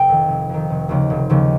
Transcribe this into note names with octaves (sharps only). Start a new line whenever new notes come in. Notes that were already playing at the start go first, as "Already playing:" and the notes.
Already playing: F1 G5
F2 D#3
F1
F2 D#3
F1
D#2 C#3 F3
F1
D#2 C#3 F3